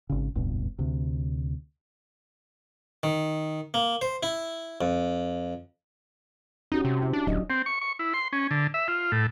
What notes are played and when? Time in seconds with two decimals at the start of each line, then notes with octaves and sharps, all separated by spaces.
0.10 G#1 C#3
0.35 F1 C#2 G2 B2
0.79 D2 C3
3.03 D#3
3.74 A#3
4.01 C5
4.23 E4
4.81 F2
6.72 C#4 D#4 F#4 G4
6.85 C3
7.02 E4
7.13 D4
7.27 D1 F#3 D4 D#5
7.50 C4
7.66 C#6
7.81 C#6
7.99 E4
8.14 C6
8.33 C#4
8.51 D3
8.74 E5
8.88 F4
9.12 A2